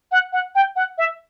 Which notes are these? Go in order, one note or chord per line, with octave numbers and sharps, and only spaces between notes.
F#5
F#5
G5
F#5
E5